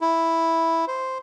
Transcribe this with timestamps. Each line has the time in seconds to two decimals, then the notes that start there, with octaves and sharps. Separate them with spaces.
0.01 E4
0.88 C5